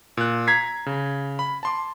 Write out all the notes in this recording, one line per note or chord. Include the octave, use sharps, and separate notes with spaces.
A#2 F#6
A#5 G#6 B6 C7
C#3
B5
A5 C6 D6